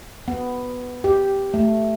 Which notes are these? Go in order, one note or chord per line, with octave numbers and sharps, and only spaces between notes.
B3
G4
A3